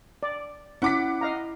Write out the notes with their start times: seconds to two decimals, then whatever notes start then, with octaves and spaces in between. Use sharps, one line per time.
0.23 D5
0.82 C#4 E4 F#5 D6 B6
1.21 D#5 F5 A#5